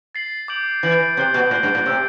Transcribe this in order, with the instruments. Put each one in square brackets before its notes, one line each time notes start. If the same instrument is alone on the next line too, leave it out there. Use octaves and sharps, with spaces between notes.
[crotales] A6 C7 F#7
D6 G6 D7 F#7
[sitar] E3 [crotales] D6 G6 D7 F#7
[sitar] C3 [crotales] G6 C7 G7
[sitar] B2
[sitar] A2 [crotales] G6 C7 G7
[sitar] G2
A2
[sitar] C3 [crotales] E6 G6 D7